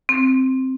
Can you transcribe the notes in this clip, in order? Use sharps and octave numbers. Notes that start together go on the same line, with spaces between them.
C4